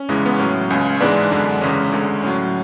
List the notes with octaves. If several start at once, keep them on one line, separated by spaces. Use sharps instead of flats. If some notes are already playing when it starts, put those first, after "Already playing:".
Already playing: C#4
E2 C#3 E3 G#3
B3
A2 F#3 C#4
C#2 C#3 G#3
G#2 E3 G#3 B3 D4
F#2 D3 G#3
E2 C#3 G#3 C#4
D2 D3 G#3
A2 F#3 C#4